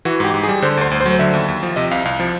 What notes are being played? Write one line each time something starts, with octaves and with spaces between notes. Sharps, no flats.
E3 F#4
G#2 G4
G#2
G#4
G3
D3 C5
D2 C5
D2
C5
F#3
D3 E5
D#2
D#2
F3
C3 D#5
C2 F5
C2 F5
F3